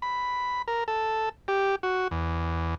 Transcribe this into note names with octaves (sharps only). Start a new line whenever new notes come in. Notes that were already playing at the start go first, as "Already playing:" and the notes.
B5
A#4
A4
G4
F#4
E2